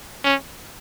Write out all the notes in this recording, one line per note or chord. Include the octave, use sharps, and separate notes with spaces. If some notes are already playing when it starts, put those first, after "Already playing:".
C#4